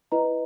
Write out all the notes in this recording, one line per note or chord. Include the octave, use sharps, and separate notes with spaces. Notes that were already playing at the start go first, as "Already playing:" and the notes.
E4 B4 D#5 A#5